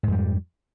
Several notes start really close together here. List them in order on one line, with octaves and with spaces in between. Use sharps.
G#2 F2 G3